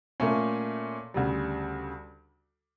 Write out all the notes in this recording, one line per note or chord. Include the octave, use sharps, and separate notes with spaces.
A#2 A3 C#4
D2 C#3 G3